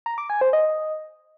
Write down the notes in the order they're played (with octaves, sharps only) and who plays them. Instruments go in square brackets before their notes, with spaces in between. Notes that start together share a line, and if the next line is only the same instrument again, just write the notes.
[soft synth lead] A#5
D6
G#5
C5
D#5